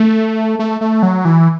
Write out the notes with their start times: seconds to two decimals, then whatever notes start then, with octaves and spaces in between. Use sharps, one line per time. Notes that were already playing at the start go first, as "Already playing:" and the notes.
Already playing: A3
0.59 A3
0.81 A3
1.03 F#3
1.25 E3